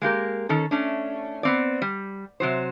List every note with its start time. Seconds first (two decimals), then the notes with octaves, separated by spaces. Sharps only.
0.02 G#3 A#3 G4 A#4
0.49 D#3 C#4 A4
0.71 A3 C#4 D4
1.43 B3 C4 D5
1.82 G3
2.40 C3 F#3 C5